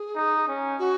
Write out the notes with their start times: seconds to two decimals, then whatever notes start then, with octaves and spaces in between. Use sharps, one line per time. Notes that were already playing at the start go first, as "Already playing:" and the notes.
Already playing: G#4
0.16 D#4
0.48 C#4
0.79 F#4